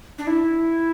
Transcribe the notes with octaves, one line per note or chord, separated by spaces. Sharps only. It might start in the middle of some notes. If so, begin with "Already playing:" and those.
D4
E4